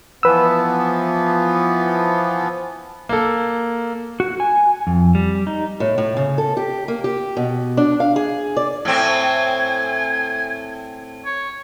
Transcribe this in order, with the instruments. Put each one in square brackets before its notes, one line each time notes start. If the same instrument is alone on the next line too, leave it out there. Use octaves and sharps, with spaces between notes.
[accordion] E3 F3 B3 [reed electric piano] B4 E6
[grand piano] A#3 A4
[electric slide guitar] F#4
G#5
F2
G3
D#4
[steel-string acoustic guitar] A2
A2
C#3
A4
G4
A#3
G4
B2
D4
F5
G#4
D5
[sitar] A2 C4 [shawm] G#5
[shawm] C#5